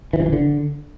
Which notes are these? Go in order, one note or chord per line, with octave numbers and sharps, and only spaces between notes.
E3
G2
E3
D3